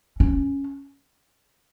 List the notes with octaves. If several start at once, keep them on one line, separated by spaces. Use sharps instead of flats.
C#4